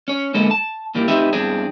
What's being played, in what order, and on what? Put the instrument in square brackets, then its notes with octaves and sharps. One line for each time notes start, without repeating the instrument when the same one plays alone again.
[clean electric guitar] C#4 C#5
D3 G#3 A#3 B3 A4
A5
A#2 E3 G3 A#3
A3 C4 D#4 G4 B4 E5
E2 G2 C4 D4 G#4